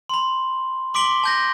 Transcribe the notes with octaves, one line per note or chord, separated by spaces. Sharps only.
B5 C6
C6 D6 B6 D7 F#7 G7
A5 G6 A#6